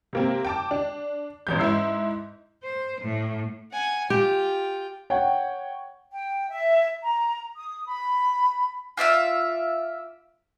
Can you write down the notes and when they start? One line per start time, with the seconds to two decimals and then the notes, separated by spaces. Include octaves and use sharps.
0.13 C3 A#3 C4
0.45 G5 A5 D6
0.71 D4
1.47 A1 E2 G6
1.59 G#2 E4 E6 C7
2.62 C5
3.00 A2
3.72 F#5 G#5
4.10 F4 G4 G5
5.10 C#5 F#5 G5
6.12 G5
6.49 E5
7.03 A#5
7.57 D#6
7.87 B5
8.97 F4 D5 E5 F5